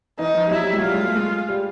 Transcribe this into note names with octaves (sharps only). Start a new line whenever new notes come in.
E3 D#4
F3
G3
F#3 E4
G3
G#3
F#3
G3 F4
G#3
A3
G#3
G3